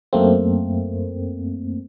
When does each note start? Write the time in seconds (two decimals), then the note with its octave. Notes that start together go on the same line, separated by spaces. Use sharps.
0.13 F#2 A3 A#3 C4